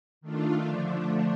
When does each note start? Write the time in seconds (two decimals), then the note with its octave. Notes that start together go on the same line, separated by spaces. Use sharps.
0.21 D#3 A3 D4 F4
0.64 D3 F3 A3 D4